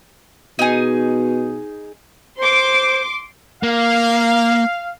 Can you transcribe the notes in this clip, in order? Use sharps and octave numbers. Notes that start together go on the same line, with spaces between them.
B2 D#4 G#4
C5 C6 D6
A#3 F5